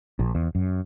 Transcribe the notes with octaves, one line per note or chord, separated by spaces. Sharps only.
A#1
E2
F#2